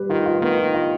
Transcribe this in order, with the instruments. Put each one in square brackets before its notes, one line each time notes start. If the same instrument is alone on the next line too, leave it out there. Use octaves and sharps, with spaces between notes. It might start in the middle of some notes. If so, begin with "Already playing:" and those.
Already playing: [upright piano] G3 B4
[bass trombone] D#3 [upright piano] F4
[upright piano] F4
[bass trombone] D#3 [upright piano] B3
[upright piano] F4
F4